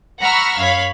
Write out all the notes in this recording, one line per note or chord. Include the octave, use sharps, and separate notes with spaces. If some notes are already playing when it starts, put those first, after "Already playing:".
F#5 A#5 B5 C#6 E6 F6
F#2 C#5 F5 B5